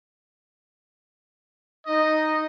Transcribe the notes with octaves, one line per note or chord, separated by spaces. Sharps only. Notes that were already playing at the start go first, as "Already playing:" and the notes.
D#4 D#5